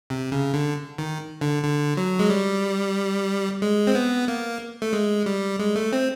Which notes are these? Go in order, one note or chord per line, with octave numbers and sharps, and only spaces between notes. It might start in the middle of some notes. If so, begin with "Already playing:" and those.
C3
C#3
D3
D#3
D3
D3
F#3
G#3
G3
G#3
C4
B3
A#3
A3
G#3
G3
G#3
A3
C4